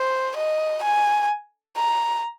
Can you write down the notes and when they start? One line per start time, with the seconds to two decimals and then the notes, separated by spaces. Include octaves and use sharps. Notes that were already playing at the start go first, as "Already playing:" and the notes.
Already playing: C5
0.37 D#5
0.83 G#5
1.77 A#5